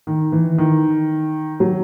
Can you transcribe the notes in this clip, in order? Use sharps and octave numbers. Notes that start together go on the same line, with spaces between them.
D#3
E3
D#3
F#3